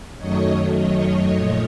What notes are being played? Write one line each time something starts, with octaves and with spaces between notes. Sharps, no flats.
F#2 D#3 F#3 A3 C#5 D#5
C#5 D#5
A#2 F3 A3